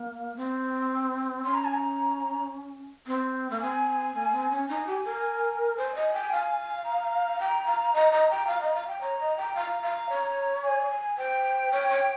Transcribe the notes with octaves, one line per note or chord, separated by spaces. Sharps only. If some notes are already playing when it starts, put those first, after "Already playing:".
Already playing: A#3
C4
C#4 C6
A#5
G#5
A#5
C4
A#3
C4 G#5
A#3
C4
C#4
D#4 G#5
G4
A#4
C5 G#5
D#5
G5
F5
A#5
G5
F5
D#5
D#5
G5
F5
D#5
F5
G5
C#5 A#5
D#5
G5
F5 A#5
F5
C#5
G#5
C5 G5
C#5
C#5